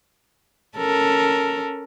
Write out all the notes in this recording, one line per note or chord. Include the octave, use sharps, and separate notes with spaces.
C#4 A4 A#4